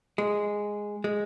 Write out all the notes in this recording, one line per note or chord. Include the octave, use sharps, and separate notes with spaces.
G#3
G#3